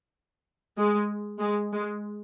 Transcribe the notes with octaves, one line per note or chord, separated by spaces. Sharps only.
G#3
G#3
G#3